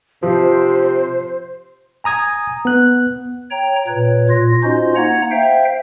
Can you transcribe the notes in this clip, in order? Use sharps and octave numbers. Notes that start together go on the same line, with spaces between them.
C3 F3 C5
G#5 A#5 D#6 G#6
B3 F#6
C#5 G5 A#5
A#2 B4 C#5
A#2 F4 A#6
C#4 D#4 F4 F#4 C5 D#5
A#3 D#4 F#5 A#5 G#6
C5 E5 F5 G5